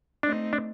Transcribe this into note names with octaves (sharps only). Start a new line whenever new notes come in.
A3 C4 D4 D#4
D4